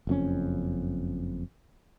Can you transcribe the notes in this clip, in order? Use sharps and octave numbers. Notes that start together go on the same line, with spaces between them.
F#1 F2 C#4